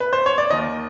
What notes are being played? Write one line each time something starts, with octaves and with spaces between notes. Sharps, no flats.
B4
C5
C#5
D5
D#2 D#3 D#5